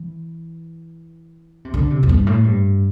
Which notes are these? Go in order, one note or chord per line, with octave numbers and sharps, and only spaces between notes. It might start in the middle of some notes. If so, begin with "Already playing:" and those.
Already playing: E3
C3
D3
C3
E2
G2
A2
G2